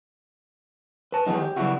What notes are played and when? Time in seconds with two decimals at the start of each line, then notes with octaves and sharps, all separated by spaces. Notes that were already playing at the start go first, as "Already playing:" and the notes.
1.12 B4 A5
1.26 D#3 E3 F#3 G#3 B3 D#4
1.38 G4
1.56 C#3 F#3 G3 B3 E4 F#4